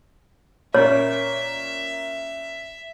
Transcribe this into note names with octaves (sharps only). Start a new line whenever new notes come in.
A#2 A#3 C#4 C#5 E5